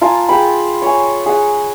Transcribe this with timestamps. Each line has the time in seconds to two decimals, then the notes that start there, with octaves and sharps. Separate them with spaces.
0.01 F4 A#4 G#5 A5
0.29 G#4 G5 B5
0.82 C#5 G#5
1.26 G#4 F#5